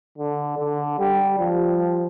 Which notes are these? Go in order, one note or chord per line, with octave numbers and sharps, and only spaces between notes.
D3
D3
G3
F3